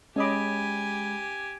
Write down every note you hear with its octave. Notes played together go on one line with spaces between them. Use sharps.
G#3 C#4 G4 D#5 G#5 B5 D6